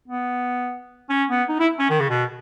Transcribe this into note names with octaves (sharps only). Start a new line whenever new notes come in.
B3
C#4
B3
D#4
E4
C#4
D#3
C#3
B2